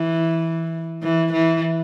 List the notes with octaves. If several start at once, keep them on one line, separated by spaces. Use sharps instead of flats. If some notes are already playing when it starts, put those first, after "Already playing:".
Already playing: E3
E3
E3